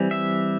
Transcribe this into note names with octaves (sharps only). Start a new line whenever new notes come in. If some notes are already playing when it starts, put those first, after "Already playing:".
Already playing: E3 G3 C4
E5